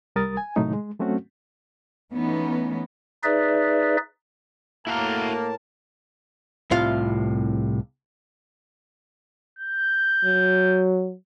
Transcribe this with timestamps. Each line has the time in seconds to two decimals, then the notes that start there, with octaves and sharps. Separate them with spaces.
0.16 C2 G3 A#4 D#6 A6
0.37 G#5
0.56 A2 C3 D#3 F#3 A3 D#4
0.73 G#3
1.00 F#3 A3 C4 C#4 F#4
2.13 E3 A3 B3 C#4 D#4
3.24 D#4 G#4 B4 D5 E5
4.87 A2 A#3 E4 F#4 A#4 F5 A5
6.71 C2 A2 C3 F4 F5
9.59 G6
10.24 F#3